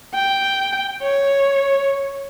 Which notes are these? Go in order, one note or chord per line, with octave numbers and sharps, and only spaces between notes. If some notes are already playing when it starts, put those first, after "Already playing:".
G5
C#5